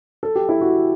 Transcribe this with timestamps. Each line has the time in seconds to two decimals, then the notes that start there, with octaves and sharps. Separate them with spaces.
0.23 A4
0.35 G4
0.49 E4
0.61 F#4